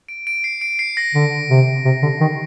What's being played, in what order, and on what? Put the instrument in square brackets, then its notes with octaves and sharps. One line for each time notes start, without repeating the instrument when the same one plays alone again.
[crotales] D7
D7
C7
D7
C7
A#6
[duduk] D3
C3
C3
D3
D#3